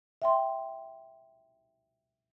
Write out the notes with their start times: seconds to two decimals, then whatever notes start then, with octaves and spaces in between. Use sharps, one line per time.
0.22 E5 G5 C6